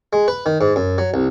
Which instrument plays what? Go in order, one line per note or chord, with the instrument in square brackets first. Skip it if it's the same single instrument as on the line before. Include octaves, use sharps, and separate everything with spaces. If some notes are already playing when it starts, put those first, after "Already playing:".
[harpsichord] G#3
B4
D#3
G#2
F#2
F#3
C2